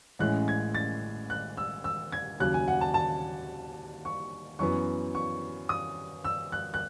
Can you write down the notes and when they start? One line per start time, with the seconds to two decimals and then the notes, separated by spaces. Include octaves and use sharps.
0.19 A1 A2 G#3 C#4 F#6
0.48 G#6
0.75 A6
1.30 F#6
1.57 E6
1.84 E6
2.12 G#6
2.40 D#2 C#3 F#3 F#6
2.54 G#5
2.68 F#5
2.81 A5
2.94 A5
4.05 C#6
4.59 F#2 E3 B3 C#6
5.15 C#6
5.69 D#6
6.24 E6
6.52 F#6
6.74 F#6